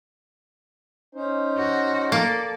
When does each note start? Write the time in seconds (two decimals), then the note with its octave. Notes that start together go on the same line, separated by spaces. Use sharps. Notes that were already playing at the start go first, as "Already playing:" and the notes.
1.15 C#4 D#4 C5
1.58 F#4
2.12 A#3 A4 D5